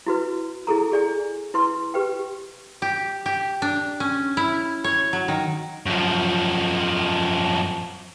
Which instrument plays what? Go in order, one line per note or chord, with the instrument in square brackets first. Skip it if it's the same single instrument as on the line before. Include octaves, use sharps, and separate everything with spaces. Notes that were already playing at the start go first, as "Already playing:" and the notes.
[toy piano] E4 F#4 B4
E4 G#4 A4 A#5
G#4 D5 G#5
E4 B4 C6
G4 B4 G5
[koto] G4
G4
D4
C#4
E4
C#5
F#3
D#3
[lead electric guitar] F#2 F3